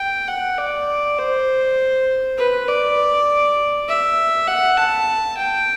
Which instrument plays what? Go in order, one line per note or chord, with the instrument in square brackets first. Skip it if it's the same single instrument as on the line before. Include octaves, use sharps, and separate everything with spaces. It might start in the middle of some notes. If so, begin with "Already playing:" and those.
Already playing: [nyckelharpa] G5
F#5
D5
C5
B4
D5
E5
F#5
A5
G5